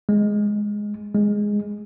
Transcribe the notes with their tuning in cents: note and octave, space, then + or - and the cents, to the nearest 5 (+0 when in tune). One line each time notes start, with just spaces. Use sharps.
G#3 +0
G#3 -5